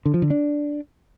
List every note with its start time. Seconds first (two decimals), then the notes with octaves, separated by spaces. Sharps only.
0.06 D3
0.14 F3
0.22 D3
0.30 D4